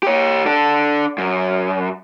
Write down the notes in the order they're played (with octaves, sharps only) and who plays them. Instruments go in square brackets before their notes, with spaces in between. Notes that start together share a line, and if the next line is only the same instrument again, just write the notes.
[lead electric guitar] G4 C#5
D4 A4
F#2